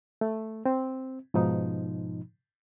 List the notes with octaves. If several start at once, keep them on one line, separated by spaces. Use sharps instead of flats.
A3
C4
G#2 B2 F3 D#4